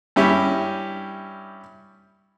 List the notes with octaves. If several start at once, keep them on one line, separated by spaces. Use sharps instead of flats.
G2 C#4 E4 G4